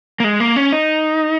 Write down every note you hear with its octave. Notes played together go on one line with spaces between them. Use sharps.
A#3
G#3
A#3
C#4
D#4